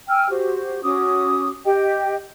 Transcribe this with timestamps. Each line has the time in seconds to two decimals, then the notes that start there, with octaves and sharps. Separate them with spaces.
0.09 G5 G#5 E6 F6
0.30 F#4 G4 C5
0.83 C#4 F#4 D6 D#6
1.65 G4 D#5 G5